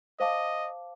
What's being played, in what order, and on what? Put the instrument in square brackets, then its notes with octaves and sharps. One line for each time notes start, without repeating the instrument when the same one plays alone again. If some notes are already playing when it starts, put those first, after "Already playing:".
[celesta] C5 F5 A5 D6 [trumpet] D#5